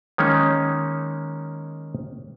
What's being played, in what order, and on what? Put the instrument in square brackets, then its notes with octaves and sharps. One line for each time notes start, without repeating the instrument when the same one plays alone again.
[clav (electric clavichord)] D#3 G#3 A#3 C#4 D#4